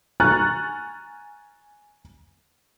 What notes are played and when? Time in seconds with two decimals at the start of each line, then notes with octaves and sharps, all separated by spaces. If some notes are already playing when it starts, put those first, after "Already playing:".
0.20 G#5 A#5 C#6 F6 F#6 A6